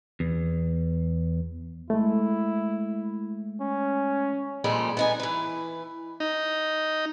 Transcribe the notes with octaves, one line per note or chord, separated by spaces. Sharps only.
E2
G#3 A3 E4
C#4
A#2 F3 G3 G#3 A4
B3 D#4 G#5
E3 B4
D#4